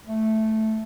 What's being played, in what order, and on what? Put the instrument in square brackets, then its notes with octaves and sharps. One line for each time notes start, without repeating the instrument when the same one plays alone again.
[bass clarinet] A3